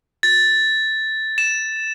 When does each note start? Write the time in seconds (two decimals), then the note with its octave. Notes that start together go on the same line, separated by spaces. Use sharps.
0.23 A6
1.38 E7